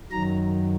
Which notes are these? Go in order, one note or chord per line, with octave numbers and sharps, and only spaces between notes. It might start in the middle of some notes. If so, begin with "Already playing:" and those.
F#2 D#3 F#3 A#5